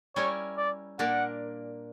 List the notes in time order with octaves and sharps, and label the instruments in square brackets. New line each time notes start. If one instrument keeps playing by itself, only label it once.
[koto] G3 C#4 E4 A#4 [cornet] C#5
[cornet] D5
[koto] A#2 A#3 D4 A#4 [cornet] F#5